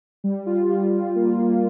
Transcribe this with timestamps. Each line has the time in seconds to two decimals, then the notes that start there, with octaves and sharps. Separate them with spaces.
0.24 G3
0.46 F4
0.69 G3
0.93 G3
1.15 A#3
1.38 A#3